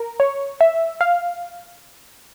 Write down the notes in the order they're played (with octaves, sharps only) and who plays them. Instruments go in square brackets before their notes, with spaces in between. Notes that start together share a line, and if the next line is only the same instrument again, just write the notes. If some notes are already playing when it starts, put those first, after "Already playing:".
Already playing: [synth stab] A#4
C#5
E5
F5